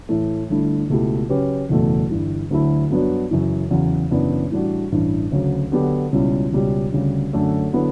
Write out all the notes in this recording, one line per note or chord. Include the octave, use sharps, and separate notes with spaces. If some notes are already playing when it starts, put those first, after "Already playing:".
A2 E3 A3
G1 G2 D3 A3 E4
C#2 B2 A3 E4 G4
C#3 F#3 C#4 G4 B4
F#1 E2 B2 A3
G1 G2 E3 G3
D2 D3 F#3 A3 E4
G2 F#3 B3 D4 F#4
F#2 C#3 E3
E2 C#3 F#3
F#1 F#2 E3 B3 D4
A2 E3 G3 D4 F#4
A1 G2 E3
D2 C#3 F#3
D3 F#3 B3 D4 G4
C#2 B2 G3 C#4 E4
C#2 B2 G3 C#4 G4
D2 C#3 G3
F#2 D3 A3 C#4
D3 F#3 B3 E4 B4